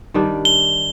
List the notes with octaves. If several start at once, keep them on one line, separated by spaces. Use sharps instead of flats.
D#3 G3 D4
G7